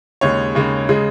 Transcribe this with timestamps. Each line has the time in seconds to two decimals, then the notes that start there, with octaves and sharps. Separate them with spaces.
0.21 D#2 C#3 G#3 C#5
0.55 D#2 C#3 G#3
0.89 C#3 G#3